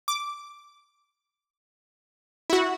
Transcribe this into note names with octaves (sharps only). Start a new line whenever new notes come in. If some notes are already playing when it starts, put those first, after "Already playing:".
D6
E4 F#4